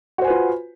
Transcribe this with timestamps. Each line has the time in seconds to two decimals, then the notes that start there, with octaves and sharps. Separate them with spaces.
0.18 F#4
0.21 C5
0.24 G#5
0.27 B4
0.30 F4